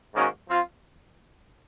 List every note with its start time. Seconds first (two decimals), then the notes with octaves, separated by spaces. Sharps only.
0.14 G#2 D#3 A#3 C#4 F#4
0.48 F3 C4 F4